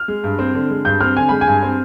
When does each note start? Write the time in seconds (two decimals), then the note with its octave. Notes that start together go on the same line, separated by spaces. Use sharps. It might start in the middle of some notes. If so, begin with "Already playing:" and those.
Already playing: F6
0.08 G#3
0.24 G2
0.39 C4
0.54 D3
0.70 G#3
0.85 G2 G6
1.01 C4 F6
1.16 D3 G#5
1.29 G#3 B5
1.41 G#5
1.47 G2
1.63 C4